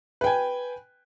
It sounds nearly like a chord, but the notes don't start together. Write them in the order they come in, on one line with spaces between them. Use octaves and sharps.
B4 G5 G#5